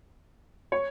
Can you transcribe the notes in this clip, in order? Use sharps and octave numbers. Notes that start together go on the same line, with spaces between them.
C#5